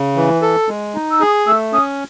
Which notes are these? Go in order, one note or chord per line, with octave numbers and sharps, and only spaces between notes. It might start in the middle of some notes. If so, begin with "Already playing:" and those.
Already playing: C#3
E3
A4
G#3
D#4
E6
G#4 D#6
A3 E6
C#4 D#6